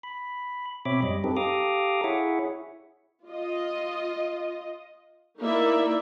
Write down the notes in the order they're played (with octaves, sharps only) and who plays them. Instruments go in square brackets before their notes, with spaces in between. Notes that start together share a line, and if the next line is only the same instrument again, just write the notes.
[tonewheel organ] B5
B2 C4 C#5 E5 B5 D6
F#2 G3 D#5
C4 D#4 G4 A4 B4
G4 A4 F5 A#5 D6 D#6
E4 G#4 C#5 E5 F#5
[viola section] F4 D#5
A#3 D#4 E4 A#4 D5 E5